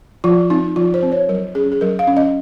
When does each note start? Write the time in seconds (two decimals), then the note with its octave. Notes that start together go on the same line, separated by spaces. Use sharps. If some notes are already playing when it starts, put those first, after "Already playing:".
0.24 F3 F4
0.50 C4 D#4
0.76 F3 F4
0.94 C5
1.03 C4
1.12 C#5
1.29 F#3 A#4
1.55 C#4 G#4
1.72 G#4
1.81 F#3 A#4
1.99 F5
2.07 C#4
2.17 D#5